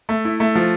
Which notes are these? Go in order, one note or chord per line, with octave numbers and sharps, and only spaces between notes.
A3
E4
A3
F3